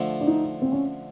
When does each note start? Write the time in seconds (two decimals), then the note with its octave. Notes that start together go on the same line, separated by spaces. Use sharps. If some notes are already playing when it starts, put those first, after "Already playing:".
Already playing: D3 F3 A3
0.20 D4
0.27 D#4
0.62 C4
0.72 C#4